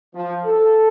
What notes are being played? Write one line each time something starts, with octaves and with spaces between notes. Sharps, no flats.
F3
A4